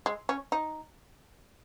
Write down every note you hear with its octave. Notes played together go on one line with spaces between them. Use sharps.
G#3
C#4
D#4